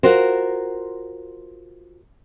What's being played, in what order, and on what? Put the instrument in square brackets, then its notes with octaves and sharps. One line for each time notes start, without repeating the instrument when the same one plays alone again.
[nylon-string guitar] F4 F#4 A#4 C5